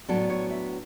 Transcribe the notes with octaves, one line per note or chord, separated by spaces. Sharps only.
A2 F#3 B3 D4 A4
C#5
E5